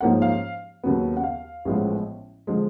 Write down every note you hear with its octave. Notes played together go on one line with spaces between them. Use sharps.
G#2 F3 A#3 C#4 F#5
F5
D#2 C#3 F#3 B3
F#5
F5
A1 A2 F3 G#3 B3
D3 F3 G#3